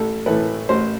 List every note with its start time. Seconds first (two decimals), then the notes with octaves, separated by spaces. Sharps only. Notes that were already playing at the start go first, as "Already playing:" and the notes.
Already playing: A1 A4
0.26 A2 E3 A3 B4
0.69 A1 C5